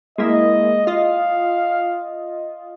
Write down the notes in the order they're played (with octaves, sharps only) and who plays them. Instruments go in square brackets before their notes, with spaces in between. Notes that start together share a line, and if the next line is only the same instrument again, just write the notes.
[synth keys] G#3 A#3 E4 [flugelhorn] D#5
[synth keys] F4 D#5 [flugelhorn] F5